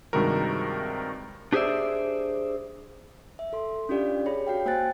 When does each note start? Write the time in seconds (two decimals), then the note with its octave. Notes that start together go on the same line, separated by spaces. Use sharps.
0.13 G2 C3 D#3 G#3 F#4 A#4
1.53 D4 G4 G#4 C5 D5 E5
3.39 E5
3.53 A4 C6
3.89 C#4 D4 F4 G4 D5 F5
4.26 G#4 C#5 B5
4.46 F#4 F5 G5
4.66 A#3 C5 G5 G#5 F#6 A6